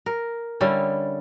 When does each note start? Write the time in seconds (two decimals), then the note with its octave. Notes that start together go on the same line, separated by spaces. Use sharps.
0.06 A#4
0.60 D3 G3 C#4 E4